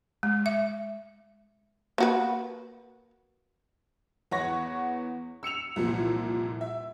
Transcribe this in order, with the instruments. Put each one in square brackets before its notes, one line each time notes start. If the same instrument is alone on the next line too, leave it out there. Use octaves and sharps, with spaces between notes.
[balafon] G#3
E5
[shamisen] A#3 F#4 B4
[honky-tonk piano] E2 B3 C#5 F#5 C#6 A#6
E6 C#7 E7 F7
C2 F2 A#2 E3
E5